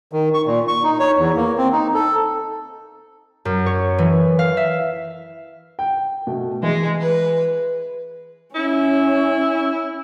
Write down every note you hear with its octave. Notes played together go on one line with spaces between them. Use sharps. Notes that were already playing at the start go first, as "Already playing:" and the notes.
D#3
C#6
A#2
C#6
D#4
C#5
E2
A#3
C4
D#4
A4
F#2
C#5
E3
F5
E5
G5
B2 A3
E3 G#3 G#4
B4
C#4 E4